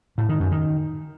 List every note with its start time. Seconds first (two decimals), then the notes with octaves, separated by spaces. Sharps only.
0.18 A2
0.29 D#3
0.40 F#2
0.51 D#3